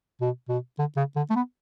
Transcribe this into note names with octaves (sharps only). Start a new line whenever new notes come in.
B2
B2
D3
C#3
D3
A3
B3